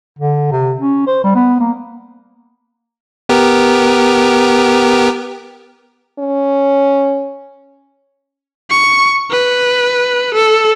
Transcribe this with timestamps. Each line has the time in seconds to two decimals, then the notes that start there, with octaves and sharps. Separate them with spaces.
0.19 D3
0.52 C3
0.79 C#4
1.07 C5
1.24 G3
1.35 B3
1.60 A#3
3.29 B3 G4 A#4
6.19 C#4
8.70 C#6
9.31 B4
10.34 A4